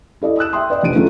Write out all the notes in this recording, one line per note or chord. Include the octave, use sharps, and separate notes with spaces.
E4 A4 D5 D#5
D#6 E6 F#6 E7
E5 G5 C6 D#6
B4 D5 D#5 G5
F1 A#1 D7 D#7
F#2 D3 A3 F4